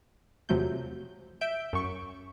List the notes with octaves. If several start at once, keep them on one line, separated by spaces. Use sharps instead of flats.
E2 C3 F3 F#3 A3 G6
E5 G6 D7
F#2 F#3 C#6